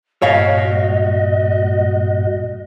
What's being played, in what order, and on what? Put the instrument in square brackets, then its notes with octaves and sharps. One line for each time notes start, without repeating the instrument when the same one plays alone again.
[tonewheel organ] G2 A#2 F#4 [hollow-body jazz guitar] C#5 F5 [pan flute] D#5